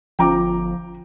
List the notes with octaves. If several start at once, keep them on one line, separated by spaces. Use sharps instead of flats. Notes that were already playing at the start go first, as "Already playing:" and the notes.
G1 F3 G5 A#5 D6